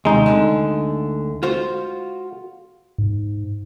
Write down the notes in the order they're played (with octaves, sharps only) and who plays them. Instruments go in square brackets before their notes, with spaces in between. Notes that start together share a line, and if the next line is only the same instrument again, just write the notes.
[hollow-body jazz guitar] D#2 C3 [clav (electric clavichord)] G#3 D#4
[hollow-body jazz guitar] D2 D3 D4
F4 F#4 C5
[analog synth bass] G#2